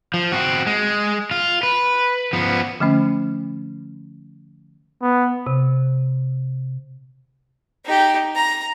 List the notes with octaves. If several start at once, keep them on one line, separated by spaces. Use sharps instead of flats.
F3
C4 F#4
G#3
F4
B4
F3 B3
D3 F3 A3 C#4
B3
C3
D#4 G4
A#5